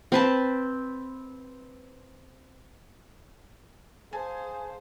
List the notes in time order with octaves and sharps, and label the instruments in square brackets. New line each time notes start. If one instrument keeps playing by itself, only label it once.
[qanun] C4 B4 A5
[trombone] G#4 [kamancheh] C5 F5 [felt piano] G#5 A5